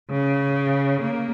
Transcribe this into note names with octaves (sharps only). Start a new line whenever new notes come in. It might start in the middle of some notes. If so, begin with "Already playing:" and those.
C#3
A#3